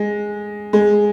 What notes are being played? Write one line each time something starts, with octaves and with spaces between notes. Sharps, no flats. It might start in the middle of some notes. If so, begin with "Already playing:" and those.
Already playing: G#3
G#3